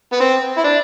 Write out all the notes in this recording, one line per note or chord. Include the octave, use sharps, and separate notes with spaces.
B3
C4
E4
D4